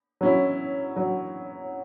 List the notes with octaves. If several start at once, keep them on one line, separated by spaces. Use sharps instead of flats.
F#3 C#4 E4
F#3